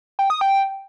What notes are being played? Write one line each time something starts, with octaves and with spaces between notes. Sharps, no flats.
G5
D#6
G5